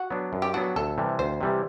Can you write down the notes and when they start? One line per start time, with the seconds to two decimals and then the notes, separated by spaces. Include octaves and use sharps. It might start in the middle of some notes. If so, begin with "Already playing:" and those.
Already playing: F#4
0.10 F#3 B3 D4
0.33 F#2
0.42 G4
0.54 F#3 B3 D4 F#4
0.76 D2 A4
0.98 C3 E3 G3
1.19 D2 C5
1.41 C3 E3 G3